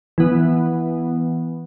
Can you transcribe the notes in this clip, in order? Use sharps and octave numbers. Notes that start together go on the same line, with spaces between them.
E3 B3